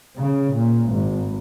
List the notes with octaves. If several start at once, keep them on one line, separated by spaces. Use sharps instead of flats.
C#3
A#2
G#1